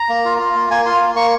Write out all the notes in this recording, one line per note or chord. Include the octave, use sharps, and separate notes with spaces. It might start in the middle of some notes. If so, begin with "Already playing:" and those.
Already playing: A#5
A#3
F4
F4
A#3
A#3 G#5
F4 C6
A#3
A#3 C#6